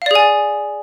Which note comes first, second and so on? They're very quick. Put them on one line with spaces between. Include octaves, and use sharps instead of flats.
F5 D5 G#4 G#5